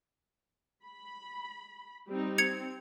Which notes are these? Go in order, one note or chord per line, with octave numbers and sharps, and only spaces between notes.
B5
G3 C4 D#4
C4 G#6 C#7 F7